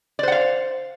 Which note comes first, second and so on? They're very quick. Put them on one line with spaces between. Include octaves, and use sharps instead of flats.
D5 C5 F#5 F5